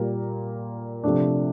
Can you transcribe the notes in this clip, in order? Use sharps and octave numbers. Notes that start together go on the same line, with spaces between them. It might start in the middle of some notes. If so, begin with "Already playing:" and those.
Already playing: A#2 G3 A#3 F4 A#4
C3 F3 A3 D4